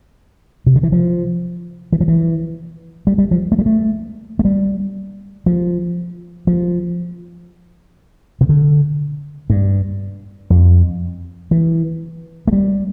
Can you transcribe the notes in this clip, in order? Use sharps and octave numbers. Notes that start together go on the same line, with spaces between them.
C3
D3
E3
F3
E3
F3
E3
G3
G3
F3
A3
G3
A3
A3
G3
F3
F3
C3
D3
G2
F2
E3
A3
G3